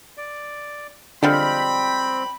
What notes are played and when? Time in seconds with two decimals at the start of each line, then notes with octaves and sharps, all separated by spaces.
0.17 D5
1.23 D3 F3 G3 G#3 C4 G5 B5